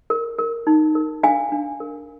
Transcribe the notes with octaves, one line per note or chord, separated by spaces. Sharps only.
A#4
A#4
D#4
A#4
D4 F5 G#5
D4
A#4